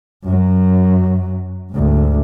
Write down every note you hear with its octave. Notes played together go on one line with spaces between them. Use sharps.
F#2 F#3
D2 G#2